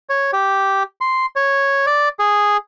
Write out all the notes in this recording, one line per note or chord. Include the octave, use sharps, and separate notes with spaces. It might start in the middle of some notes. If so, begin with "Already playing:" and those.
C#5
G4
C6
C#5
D5
G#4